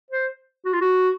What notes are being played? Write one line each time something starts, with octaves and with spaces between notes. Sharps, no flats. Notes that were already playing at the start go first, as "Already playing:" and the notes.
C5
F#4
F4
F#4